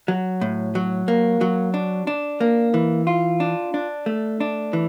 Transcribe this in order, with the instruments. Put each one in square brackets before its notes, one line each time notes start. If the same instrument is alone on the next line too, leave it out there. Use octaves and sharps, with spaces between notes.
[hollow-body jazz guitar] F#3
A2
F#3
A#3
F#3
D4
D4
A#3
E3
F4
D4
D4
A3
D4
E3